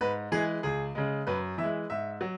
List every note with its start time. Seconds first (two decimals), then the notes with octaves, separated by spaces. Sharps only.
0.01 G#2 B4
0.32 E3 G#3 G#4
0.63 C#2 G#4
0.95 C#3 G#3
1.27 F#2 B4
1.58 E3 E5
1.63 G#3
1.90 G#2 E5
2.21 F#3